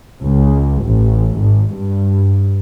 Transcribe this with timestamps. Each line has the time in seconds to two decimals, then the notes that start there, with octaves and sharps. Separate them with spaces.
0.24 C#2
0.88 A1
1.41 G#1
1.75 G2